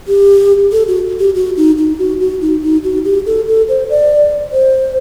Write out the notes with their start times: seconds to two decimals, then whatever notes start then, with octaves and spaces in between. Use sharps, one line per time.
0.08 G4
0.72 A4
0.87 F#4
1.19 G4
1.35 F#4
1.57 D#4
1.78 D#4
1.99 F#4
2.20 F#4
2.41 D#4
2.63 D#4
2.84 F#4
3.05 G4
3.26 A4
3.47 A4
3.69 C5
3.90 D5
4.53 C5